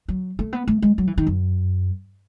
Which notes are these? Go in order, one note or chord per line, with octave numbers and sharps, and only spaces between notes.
F#3
A3
B3
A3
G#3
F#3
E3
D#3
F#2